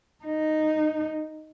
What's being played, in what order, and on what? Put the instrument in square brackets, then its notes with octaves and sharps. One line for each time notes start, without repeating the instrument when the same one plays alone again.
[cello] D#4